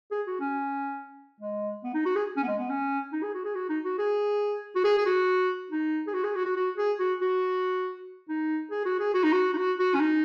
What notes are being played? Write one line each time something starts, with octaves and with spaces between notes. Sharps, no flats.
G#4
F#4
C#4
G#3
B3
D#4
F#4
G#4
C#4
B3
G#3
B3
C#4
D#4
G#4
F#4
G#4
F#4
D#4
F#4
G#4
F#4
G#4
G#4
F#4
D#4
G#4
F#4
G#4
F#4
F#4
F#4
G#4
F#4
F#4
D#4
G#4
F#4
G#4
F#4
D#4
F#4
D#4
F#4
F#4
C#4
D#4